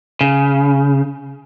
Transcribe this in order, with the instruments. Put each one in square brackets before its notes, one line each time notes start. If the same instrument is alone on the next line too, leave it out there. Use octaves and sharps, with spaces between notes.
[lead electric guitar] C#3